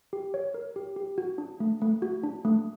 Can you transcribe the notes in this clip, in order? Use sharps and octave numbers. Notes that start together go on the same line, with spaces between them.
G4
C#5
A#4
G4
G4
F#4
D4
A3
A3
F#4
D4
A3